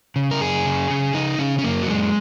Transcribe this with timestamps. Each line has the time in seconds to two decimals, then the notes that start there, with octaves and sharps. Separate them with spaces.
0.16 C#3
0.31 A#4
0.40 F#2 G#4
0.66 C#3
0.90 C#3
1.14 C#3 D#4
1.39 C#3 C#4
1.59 C#4
1.64 F#2 A#3
1.83 F#3
1.88 F#2 G#3